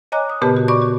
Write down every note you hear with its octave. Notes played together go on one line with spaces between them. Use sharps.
C#5 D#5 G#5 A#5 D6 F#6
D#6
A#2 C#3 B3 G4 B4 A5
F#4
F#4 D5 B5 C#6 D6
F#4